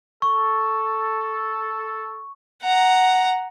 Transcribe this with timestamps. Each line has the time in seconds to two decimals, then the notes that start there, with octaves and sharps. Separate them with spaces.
0.22 A4 C#6
2.63 F#5 A#5